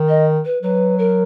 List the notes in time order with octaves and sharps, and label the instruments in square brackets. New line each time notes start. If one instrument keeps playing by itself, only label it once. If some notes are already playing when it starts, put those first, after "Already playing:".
Already playing: [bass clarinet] D#3
[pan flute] D#5
B4
[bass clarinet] F#3 [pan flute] B4
[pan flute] A#4